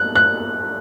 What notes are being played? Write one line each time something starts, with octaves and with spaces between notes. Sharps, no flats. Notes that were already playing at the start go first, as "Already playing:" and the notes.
Already playing: F#6
F#6